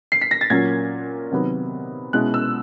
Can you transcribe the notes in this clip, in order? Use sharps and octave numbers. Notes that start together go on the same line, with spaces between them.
C7
B6
A#6
A6
A#2 F#3 A#3 C#4 G#6
C3 D#3 F#3 B3
B2 G#3 C#4 E4 F#6
E6